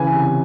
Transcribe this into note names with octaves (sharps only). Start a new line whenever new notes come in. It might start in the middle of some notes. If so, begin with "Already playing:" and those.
Already playing: C#3 E3 G#5
C3